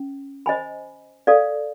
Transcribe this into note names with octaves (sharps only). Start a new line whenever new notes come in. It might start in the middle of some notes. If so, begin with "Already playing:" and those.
Already playing: C#4
C5 D#5 G#5 B5
A4 D5 F5